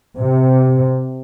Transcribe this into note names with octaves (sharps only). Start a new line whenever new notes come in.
C3